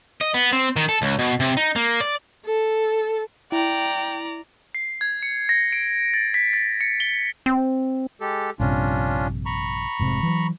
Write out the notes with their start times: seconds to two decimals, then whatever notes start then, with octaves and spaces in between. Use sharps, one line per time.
0.21 D#5
0.34 B3
0.53 C4
0.76 D#3
0.89 A4
1.02 C#2
1.19 B2
1.40 C3
1.57 D#4
1.76 A#3
2.01 D5
2.45 A4
3.52 E4 D5 G5 A#5
4.75 C7
5.01 G#6
5.23 C#7
5.49 A#6
5.73 D7
6.14 A6
6.34 B6
6.53 A6
6.81 C#7
7.00 G7
7.46 C4
8.21 G#3 G4 A4
8.60 A#1 G2 C3 C#4 D4 F4
9.46 A#5 B5 C#6
9.99 F1 G#2 C3
10.23 E3 F#3